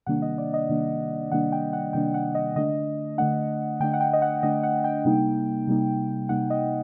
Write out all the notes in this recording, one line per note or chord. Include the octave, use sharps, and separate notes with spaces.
C3 D#3 G3 A#3 D4 F#5
D#5
D5
D#5
C3 D#3 G3 A#3 D4
C3 D#3 G3 A#3 D4 F#5
G5
F#5
C3 D#3 G3 A#3 D4 G5
F#5
D#5
D3 A3 D4 D#5
D3 A3 D4 F#5
D3 A3 D4 G5
F#5
G5
D#5
F#5
D3 A3 D4 D#5
F#5
G5
C3 G3 A#3 D#4
C3 G3 A#3 D#4
C3 G3 A#3 D#4 F#5
D#5